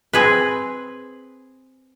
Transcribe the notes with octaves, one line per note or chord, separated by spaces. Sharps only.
C4 G#4 B4